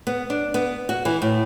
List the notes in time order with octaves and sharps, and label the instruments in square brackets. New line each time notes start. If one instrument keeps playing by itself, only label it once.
[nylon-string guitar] B3
D4
B3
F#4
E3
A2